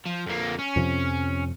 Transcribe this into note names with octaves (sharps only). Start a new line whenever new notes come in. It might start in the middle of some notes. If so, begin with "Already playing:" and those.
F3
F2 A#3
C#4
F2 C3 F3